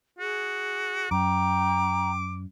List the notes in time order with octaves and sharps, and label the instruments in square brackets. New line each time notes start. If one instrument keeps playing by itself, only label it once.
[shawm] F#4 [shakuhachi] G#4
[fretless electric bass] F#2 [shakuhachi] G5 [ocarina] A#5 [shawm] D6